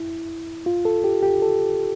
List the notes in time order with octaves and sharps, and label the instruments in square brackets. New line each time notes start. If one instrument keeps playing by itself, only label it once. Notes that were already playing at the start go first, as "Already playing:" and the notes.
Already playing: [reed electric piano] E4
F4
A4
G4
G4
A4